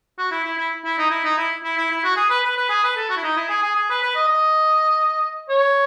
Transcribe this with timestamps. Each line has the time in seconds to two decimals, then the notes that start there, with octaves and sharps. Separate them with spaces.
0.18 F#4
0.31 E4
0.44 E4
0.57 E4
0.84 E4
0.98 D#4
1.10 E4
1.24 D#4
1.38 E4
1.63 E4
1.77 E4
1.91 E4
2.04 F#4
2.16 G#4
2.30 B4
2.44 B4
2.57 B4
2.69 G#4
2.84 B4
2.97 A4
3.10 F#4
3.17 E4
3.23 D#4
3.37 E4
3.49 G#4
3.62 G#4
3.75 G#4
3.90 B4
4.03 B4
4.15 D#5
4.28 D#5
5.49 C#5